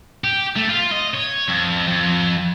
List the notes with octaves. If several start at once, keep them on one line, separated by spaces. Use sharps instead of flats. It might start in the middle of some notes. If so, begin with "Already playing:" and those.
G4
A3
F4
D#5
C#5
F2
F2